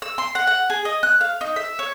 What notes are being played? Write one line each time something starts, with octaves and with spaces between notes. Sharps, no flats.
E6
C6
F#5
F#5
G#4
D#5
F#6
F5
D#4
E5
C#5